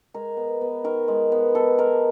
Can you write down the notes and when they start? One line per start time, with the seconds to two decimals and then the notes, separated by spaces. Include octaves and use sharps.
0.14 G#3 A#4
0.37 B3
0.61 B3
0.84 D#3 A#4
1.08 G#3
1.32 B3
1.55 B3 A4
1.79 G#3 A#4